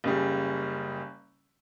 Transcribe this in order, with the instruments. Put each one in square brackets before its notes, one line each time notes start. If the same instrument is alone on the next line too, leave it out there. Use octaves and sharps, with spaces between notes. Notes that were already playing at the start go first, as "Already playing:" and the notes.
[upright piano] F#1 C#3 G3